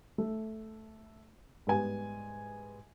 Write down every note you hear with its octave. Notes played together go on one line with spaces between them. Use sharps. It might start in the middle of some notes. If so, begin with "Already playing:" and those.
A3
G#2 G3 B3 G#5